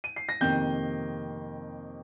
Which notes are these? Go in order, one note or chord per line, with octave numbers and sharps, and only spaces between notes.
D#7
C7
A#6
F2 C3 D#3 A#3 G5 G6